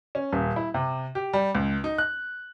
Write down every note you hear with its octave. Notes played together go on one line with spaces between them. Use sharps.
C#4
D#1
E4
C3
G4
G3
C#2
D#4
F#6